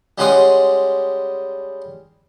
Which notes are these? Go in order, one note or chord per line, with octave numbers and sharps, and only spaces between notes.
G3 G#3 C#4 F#5 C6 D#6